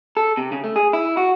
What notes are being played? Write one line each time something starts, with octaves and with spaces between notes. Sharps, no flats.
A4
C3
C#3
A3
G#4
E4
F#4